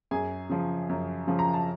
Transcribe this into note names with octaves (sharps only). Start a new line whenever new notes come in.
F#2 G#4 G#5
C#3 F3
F#2
C#3 F3
A#5
A5